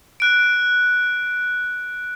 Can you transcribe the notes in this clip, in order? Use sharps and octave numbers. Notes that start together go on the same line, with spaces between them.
F#6 D7